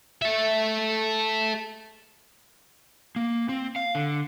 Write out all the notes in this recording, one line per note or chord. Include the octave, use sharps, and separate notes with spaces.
A4 E5
A#3
C4
F5
D3